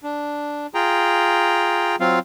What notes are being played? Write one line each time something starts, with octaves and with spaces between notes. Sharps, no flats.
D4
F4 G#4 G5 A#5
F#3 C4 F4 F5